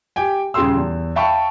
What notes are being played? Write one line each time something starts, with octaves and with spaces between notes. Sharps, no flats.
G4 G5 G#5
D#1 C#3 G#4 G5 C6 E6
E2
E5 F5 G5 A5 B5 C#6